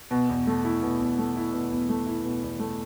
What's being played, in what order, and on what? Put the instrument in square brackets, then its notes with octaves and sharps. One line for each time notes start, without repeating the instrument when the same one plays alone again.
[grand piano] B2
E2
A3
E4
B2
E2
A3
E4
B2
E2
A3
E4
B2
E2
A3